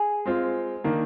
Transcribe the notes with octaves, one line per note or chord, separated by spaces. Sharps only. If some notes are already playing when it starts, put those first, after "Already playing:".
Already playing: G#4
G#3 C4 F4
D#3 A#3 D4